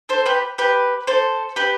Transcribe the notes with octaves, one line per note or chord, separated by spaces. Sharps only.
A4 C5
G4 B4
G4 B4
A4 C5
G4 B4